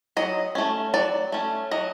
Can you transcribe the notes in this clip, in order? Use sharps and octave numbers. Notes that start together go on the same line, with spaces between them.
F#3 D#5
A3 C#4
F#3 D5
A3 C#4
F#3 D#5